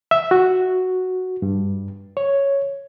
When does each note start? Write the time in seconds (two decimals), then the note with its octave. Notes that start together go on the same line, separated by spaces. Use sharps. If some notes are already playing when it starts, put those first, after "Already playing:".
0.11 E5
0.31 F#4
1.42 G2
2.17 C#5